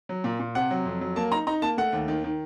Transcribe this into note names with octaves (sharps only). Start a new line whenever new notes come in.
F#3
A#2
A#2
C3 F#5
F#3
F2
F#3
A#3 A5
D#4 A#5
D#4 A#5
A#3 A5
A3 F#5
D#2
D#3
D#3